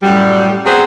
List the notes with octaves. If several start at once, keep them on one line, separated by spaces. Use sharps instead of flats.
F#2 A2 G3
F#3 B3 C4 G#4 C5